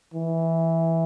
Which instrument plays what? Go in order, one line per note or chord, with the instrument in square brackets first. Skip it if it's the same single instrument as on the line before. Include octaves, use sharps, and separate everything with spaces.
[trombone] E3